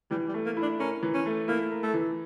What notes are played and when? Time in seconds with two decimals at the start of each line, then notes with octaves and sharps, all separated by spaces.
0.11 E3 G3
0.28 G3
0.34 A3
0.45 A#3
0.57 E4
0.62 D4
0.79 C#4 A#4
1.03 E3
1.14 C#4
1.26 A3
1.48 A#3 E4
1.71 A#4
1.83 A3
1.94 E3